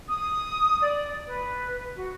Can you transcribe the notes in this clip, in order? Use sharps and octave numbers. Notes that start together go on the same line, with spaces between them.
D#6
D5
B4
F#4